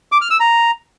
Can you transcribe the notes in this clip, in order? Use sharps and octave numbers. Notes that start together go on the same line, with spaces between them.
D6
F6
E6
A#5